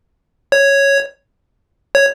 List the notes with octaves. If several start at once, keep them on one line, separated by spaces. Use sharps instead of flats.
C#5
C#5